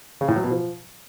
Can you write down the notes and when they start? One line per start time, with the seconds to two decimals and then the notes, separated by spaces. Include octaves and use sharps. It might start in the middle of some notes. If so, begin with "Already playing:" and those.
0.21 C#3
0.28 A2
0.36 F#3
0.44 B2
0.51 F3